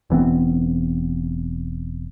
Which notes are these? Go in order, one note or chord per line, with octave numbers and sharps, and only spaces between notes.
E1 E3 B3 C4